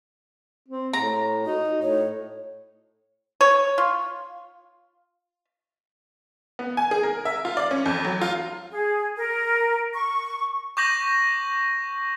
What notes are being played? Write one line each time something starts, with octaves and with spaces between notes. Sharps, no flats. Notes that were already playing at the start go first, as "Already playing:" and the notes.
C4
A2 A#5
D#4 F#4
A2 C#5
C#5
F4
B3
G#5
G#4
A#4
E5
F4
D5
C#4
F2
F#3
F4
G#4
A#4
C#6
C#6 D6 G6 A#6 F#7